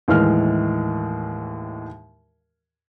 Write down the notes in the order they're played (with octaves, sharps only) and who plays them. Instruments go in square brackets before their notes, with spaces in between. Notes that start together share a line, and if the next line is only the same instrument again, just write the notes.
[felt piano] D#2 A2 E3 G#3 F6